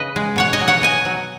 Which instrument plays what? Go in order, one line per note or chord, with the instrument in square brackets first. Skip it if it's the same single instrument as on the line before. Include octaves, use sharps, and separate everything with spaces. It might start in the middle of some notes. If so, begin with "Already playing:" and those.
Already playing: [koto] C#3 B4 D#5
G#3
B2 C#5 F#5
D#5 G#5
F#3
C#5 F#5
B2 D#5 G#5
F#3